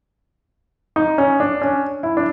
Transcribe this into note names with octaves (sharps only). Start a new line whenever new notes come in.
D#4
C#4
D4
C#4
E4
D4